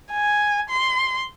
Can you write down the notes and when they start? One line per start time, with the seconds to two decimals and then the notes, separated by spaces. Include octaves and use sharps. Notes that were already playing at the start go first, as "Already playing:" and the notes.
0.12 G#5
0.69 C6